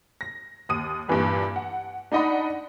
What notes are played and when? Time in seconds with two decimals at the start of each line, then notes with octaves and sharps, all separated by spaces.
0.21 A#6
0.69 D#2 D#6 D#7
1.08 G2 A#2 E3 G3
1.56 F#5
2.12 D4 D#4 D5 D#5 F#5 B5